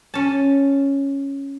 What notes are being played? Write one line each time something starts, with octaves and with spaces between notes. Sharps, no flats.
C#4 A5